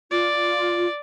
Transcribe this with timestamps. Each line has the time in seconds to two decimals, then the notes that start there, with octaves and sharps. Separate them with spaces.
0.11 F4 D5